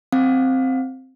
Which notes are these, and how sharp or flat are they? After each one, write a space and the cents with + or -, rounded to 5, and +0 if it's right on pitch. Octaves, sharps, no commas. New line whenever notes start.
C4 +0 F5 +20